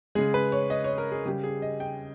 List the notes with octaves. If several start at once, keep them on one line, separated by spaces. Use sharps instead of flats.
C#3 G#3 G#4
B4
C#5
D#5
C#5
A#4
G#4
C#3 G3 G4
G#4
D#5
G5